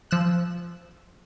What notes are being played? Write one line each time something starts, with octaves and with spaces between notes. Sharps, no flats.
F3 E6 F#6